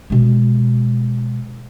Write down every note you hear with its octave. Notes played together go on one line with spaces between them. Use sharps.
B2 G#3